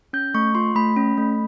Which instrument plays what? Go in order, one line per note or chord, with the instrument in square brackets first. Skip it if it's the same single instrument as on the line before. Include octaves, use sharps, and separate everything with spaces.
[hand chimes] C#4 G6
A3 C#6
F4 C6
A3 B5
C#4
A3